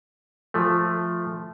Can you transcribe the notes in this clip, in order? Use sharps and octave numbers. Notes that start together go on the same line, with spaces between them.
F3 A3